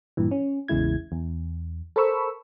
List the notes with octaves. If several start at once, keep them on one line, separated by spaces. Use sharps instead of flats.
G2 A#2 E3
C#4
A1 E2 C#3 G#3 E4 G#6
E2
A4 A#4 C5 B5 C#6 E6